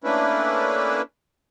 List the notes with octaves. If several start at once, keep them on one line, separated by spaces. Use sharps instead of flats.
A3 A#3 C#4 D4 E4 B4